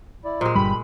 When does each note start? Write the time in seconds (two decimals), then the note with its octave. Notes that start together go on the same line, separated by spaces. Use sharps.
0.25 E4 D5
0.41 A#2 G#3 C5 D#5 A#5
0.55 G1 G2 G3 G4 B5